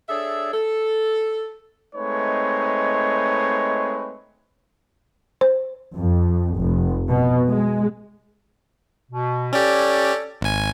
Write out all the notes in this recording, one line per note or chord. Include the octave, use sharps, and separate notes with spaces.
D4 G#4 A4 C#5 E5
A4
G#3 A3 C4 D#4 B4 C#5
C5
F2
F1
B2
G#3
B2
C#4 G4 A4 C#5 D5
G#1 G#5